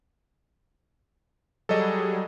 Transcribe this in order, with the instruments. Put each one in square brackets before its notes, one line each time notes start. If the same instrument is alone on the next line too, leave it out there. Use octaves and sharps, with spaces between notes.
[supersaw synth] F#3 G3 G#4 [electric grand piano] A4 C#5 D#5